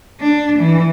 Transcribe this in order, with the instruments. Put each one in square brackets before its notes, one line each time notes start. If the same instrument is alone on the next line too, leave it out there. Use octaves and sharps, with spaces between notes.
[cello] D4
E3